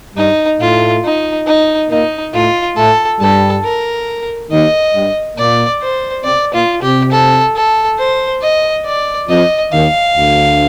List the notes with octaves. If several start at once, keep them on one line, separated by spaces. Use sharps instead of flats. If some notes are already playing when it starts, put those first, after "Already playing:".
G2 G3 D#4
A2 A3 F4
D#4
D#4
A#2 A#3 D#4
A2 A3 F4
A2 A3 A4
G2 G3 A4
A#4
D#2 D#3 D#5
G2 G3
A#2 A#3 D5
C5
C3 C4 D5
A#2 A#3 F4
C3 C4 G4
A4
A4
C5
D#5
D5
F2 F3 D#5
D#2 D#3 F5
D2 D3